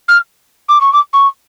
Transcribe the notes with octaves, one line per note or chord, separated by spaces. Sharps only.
F6
D6
C#6
D6
C#6